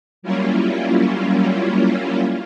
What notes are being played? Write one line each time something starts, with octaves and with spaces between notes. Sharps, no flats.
F#3 G3 A#3 C#4 E4 F4